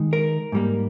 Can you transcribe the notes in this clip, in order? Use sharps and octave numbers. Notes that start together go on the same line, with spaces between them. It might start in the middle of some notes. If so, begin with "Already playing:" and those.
Already playing: D#3 G#3 D#4
A#4
G#2 G3 A#3